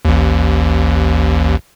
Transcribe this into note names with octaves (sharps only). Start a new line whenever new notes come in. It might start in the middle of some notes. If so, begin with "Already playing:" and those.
A1 D#2